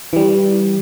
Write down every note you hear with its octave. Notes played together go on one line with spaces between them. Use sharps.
E3 G3